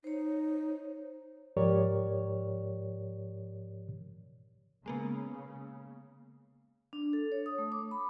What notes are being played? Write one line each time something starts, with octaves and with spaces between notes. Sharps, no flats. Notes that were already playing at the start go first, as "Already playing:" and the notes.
D#4 C5 C#5
G#2 F3 G4 A#4 C#5 D5
C#3 G#3 A#3 B3
D4
A4
C#5
D#6
A3
D6
B5